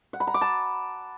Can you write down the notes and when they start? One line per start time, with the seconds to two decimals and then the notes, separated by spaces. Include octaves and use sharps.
0.13 F#5
0.20 B5
0.27 A#5
0.34 D6
0.41 A5